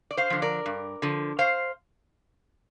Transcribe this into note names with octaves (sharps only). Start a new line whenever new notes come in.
D5
C5 F5
D3 F3
A#4 D5
G2
D3 F3
C5 F5